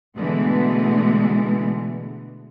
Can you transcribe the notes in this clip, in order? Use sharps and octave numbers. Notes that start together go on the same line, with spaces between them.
B2 D3 E3 G#3 A3 B3